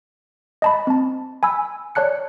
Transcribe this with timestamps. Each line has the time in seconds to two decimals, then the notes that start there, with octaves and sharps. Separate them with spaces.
0.62 D#5 A5 B5
0.87 C4 A5
1.43 G#5 B5 E6
1.95 C#5 D5 A5 F#6 C#7